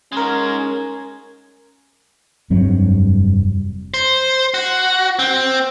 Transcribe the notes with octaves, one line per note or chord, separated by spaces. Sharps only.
G#2 G#3 C#4 A#4 G#6
F1 G2 F#3 C4
C5
F#4
C4